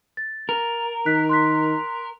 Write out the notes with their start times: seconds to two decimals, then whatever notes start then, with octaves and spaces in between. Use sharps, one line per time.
0.17 A6
0.49 A#4
1.06 D#3 F#6 B6
1.29 C6 F#6 B6